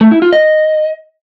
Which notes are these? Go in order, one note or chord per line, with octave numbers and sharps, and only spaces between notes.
A3
E4
F4
D#5